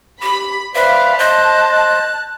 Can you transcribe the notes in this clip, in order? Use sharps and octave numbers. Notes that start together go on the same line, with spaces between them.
G4 B5
B4 C5 D5 E5 F5
C5 D#5 A5 F#6
F#6